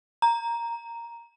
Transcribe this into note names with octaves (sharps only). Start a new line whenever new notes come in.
A#5